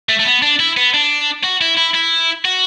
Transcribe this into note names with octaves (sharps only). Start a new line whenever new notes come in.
A3
A3
B3
D4
E4
B3
D4
F#4
E4
E4
E4
F#4